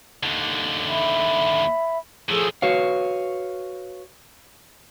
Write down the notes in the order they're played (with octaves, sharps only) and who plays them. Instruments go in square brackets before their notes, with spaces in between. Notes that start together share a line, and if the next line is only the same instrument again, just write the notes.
[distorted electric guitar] D#2 D3
[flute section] E5 B5
[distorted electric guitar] A2 F3 [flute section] G#4 A4 E6
[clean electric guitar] F#4 B4 C#5 F5